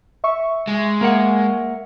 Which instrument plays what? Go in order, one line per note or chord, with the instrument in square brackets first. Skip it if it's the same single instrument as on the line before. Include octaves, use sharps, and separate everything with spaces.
[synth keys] E5 C#6
[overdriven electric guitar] G#3
[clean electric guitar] A#3 A#4 F#5